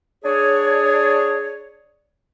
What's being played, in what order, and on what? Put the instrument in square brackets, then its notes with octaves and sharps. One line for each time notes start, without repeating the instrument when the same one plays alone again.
[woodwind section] D4 G#4 C#5